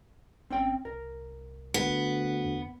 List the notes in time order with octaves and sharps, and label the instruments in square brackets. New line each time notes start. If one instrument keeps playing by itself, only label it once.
[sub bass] G#1 [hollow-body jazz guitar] C4 C#4 G5
[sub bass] C2 [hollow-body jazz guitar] A#4
[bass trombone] D2 [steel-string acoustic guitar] B3
[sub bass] E2